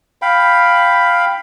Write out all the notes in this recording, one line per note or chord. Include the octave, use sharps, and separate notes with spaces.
F5 G5 B5